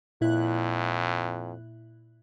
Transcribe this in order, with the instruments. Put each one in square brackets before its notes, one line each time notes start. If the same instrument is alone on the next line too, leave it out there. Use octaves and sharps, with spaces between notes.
[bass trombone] F2 [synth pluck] A#2 E4 F#6